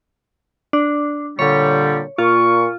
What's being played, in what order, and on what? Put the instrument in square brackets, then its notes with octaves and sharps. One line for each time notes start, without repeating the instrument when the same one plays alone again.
[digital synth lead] D4
[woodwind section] A#2 D3 G3 [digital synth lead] C#5
[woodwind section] A#2 C#6 [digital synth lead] F4